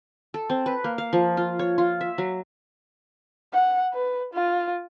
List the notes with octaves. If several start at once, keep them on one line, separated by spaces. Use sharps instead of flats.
A4
C4
B4
A#3
F5
F3
F4
C#5
F4
E5
F#3
F#5
B4
F4